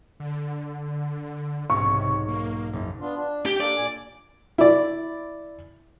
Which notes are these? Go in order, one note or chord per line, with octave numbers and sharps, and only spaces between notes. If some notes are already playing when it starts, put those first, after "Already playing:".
D3
B1 G#2 C3 C#6
A#3
F#1
B3 D4 F4
D4
G4
A#3 D4 A4 D5
A#2 G#5
E4 D5